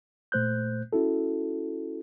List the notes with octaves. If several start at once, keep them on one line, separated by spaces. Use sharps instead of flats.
A#2 A3 C5 F#6 G6
C#4 E4 F#4 A4